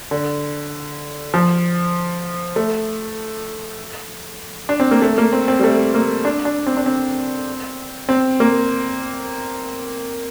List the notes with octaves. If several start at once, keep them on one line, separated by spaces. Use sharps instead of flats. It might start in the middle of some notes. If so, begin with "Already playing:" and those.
D3
F3
A3
D4
C4
A#3
A3
A#3
C4
C4
G3
A3
A#3
D4
D4
C4
D4
C4
C4
A#3